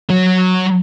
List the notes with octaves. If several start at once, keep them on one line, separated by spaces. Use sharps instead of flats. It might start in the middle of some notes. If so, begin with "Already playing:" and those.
F#3 C#5